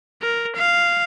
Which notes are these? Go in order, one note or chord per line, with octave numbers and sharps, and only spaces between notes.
A#4
F5